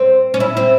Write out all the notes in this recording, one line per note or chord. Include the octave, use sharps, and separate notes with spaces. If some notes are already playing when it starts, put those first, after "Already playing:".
Already playing: C4
C#4
E4
C4